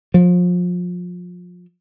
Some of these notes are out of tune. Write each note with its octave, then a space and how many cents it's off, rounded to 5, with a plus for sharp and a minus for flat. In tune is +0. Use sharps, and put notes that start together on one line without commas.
F3 +30